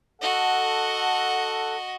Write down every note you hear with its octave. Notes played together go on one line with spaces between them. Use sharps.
F#4 A4 D#5 F#5